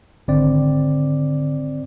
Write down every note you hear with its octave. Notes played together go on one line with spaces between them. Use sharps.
G#1 D3 C4 D5